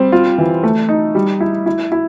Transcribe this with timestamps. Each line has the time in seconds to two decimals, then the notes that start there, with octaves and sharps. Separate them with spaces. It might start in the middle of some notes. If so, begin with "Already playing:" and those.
Already playing: G3 C4
0.12 F4
0.38 E3
0.63 A3
0.89 D#4
1.15 G3
1.40 E4
1.66 E4
1.92 E4